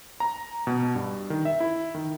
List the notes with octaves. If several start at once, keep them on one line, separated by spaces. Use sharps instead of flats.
A#5
B2
G2
D#3
E5
E4
D#3